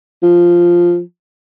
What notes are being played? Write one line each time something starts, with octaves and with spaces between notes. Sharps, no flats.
F3